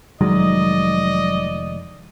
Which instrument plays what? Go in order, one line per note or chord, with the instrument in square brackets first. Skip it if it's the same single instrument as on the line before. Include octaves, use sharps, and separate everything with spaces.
[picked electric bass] F1 D#3 G#3 [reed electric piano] F#3 [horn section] D5 D#5